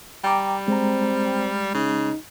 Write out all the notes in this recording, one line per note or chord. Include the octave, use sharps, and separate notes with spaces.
G3 G5 A#5 D6
G#3 C4 A#5
C#3 D#4